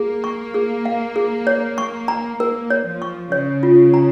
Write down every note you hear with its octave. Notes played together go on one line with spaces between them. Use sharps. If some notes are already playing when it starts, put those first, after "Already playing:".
Already playing: A#3 G#4
C#6
G#4
F5
G#4
C#5
C#6
A#5
A#3 A#4
C#5
F3
C#6
C#3 C#5
F4
A#5